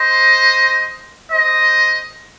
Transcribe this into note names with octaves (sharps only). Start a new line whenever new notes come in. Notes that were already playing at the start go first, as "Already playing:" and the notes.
Already playing: C5 D#5
C5 D#5